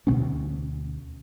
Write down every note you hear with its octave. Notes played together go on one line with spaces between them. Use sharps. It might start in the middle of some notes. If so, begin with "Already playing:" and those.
D2 B2 B3 C#4